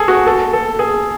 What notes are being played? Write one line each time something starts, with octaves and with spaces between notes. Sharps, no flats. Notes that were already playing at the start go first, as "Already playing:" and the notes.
Already playing: G#4 A4
F#4
A4
A4
G#4